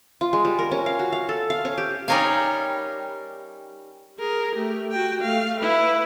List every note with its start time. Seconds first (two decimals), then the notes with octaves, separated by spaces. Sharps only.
0.21 F4
0.33 G#3
0.45 G3
0.59 A#4
0.71 C#4
0.86 F5
0.99 F#4
1.12 F5
1.29 A4
1.50 F5
1.65 C#4
1.78 G4
2.08 G3 C#4 D#4 A#4 C#5 F5
4.18 G#4 A#4
4.56 A3 G4
4.91 F#4 G5
5.21 A3 F5
5.60 E4 B4